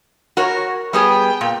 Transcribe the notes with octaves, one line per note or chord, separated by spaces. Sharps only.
F#4 A#4 C#5
G3 B3 G#4 G5
A#2